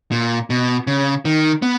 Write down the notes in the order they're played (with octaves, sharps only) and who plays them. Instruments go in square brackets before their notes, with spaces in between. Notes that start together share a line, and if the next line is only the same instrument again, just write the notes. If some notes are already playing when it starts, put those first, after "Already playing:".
[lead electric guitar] A#2
B2
C#3
D#3
B3